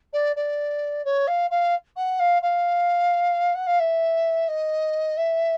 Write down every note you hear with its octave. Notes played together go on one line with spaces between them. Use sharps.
D5
D5
C#5
F5
F5
F#5
F5
F5
F#5
F5
E5
D#5
E5